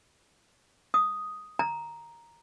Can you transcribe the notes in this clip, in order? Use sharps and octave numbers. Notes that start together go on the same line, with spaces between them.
D#6
A#5